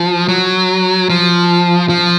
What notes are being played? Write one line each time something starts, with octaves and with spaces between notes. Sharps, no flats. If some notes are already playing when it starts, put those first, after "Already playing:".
Already playing: F3
F#3
F3
F3